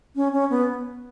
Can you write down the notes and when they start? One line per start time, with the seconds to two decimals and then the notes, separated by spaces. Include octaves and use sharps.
0.16 C#4
0.33 C#4
0.50 B3